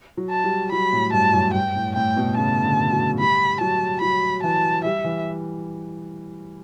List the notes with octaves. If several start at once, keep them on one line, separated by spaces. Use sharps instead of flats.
F#3
A5
G3
F#3 B5
A2
G2 A5
F#2
G2 G5
A2
A2 G5
B2
C#3 A5
D3
F#3
G3 B5
F#3 A5
F#3 B5
E3 A5
G3 E5
E3